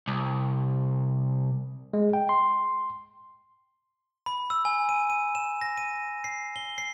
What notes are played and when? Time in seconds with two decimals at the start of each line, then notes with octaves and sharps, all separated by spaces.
0.08 C2
1.93 G#3
2.13 G5
2.29 C6
4.26 B5
4.50 E6
4.65 G#5
4.89 D#7
5.10 D#7
5.35 E7
5.61 A#6
5.77 D#7
6.24 C7
6.56 G7
6.78 C7